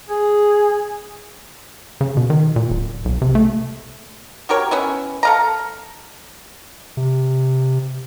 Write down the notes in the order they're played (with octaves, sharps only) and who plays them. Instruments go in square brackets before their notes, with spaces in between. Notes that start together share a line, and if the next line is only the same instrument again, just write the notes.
[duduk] G#4
[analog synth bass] C#3
B2
D#3
A#2
D1
B1
C3
A3
[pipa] F#4 G4 A#4 C#5
B3 C#4 E4
A4 F5 A#5
[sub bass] C3